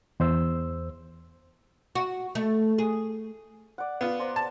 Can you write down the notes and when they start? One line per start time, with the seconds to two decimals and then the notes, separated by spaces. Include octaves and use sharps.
0.20 E2 C5 E6
1.95 F#4
2.35 A3
2.78 G#4
3.78 D5 F#5
4.01 B3 F4
4.19 C5 D5 A#5
4.36 A5